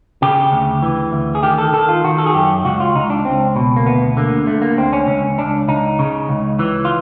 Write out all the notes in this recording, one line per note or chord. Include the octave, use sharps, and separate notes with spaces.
C#3 G4
D2
E3
D2
G#4
D#3 G4
A4
D#3 A4
F4
D#3 F#4
A4
G#4
F#2 G4
C#2 F#4
F4
C#2 D#4
D4
C#2 C4
B2
A#3
D2 B3
D3 A#3
D3 A3
A#3
D2 C4
C#4
C#2 C#4
C#2 D4
C#2 D#4
C#3
C#2
E3
F4